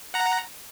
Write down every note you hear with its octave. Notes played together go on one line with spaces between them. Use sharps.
F#5 A#5